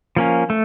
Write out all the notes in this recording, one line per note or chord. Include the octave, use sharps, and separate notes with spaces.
F3 A#3 C#4
A3